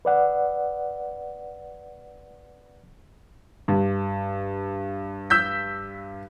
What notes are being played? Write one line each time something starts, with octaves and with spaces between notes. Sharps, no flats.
B4 D5 F#5
G2
E6 G6 B6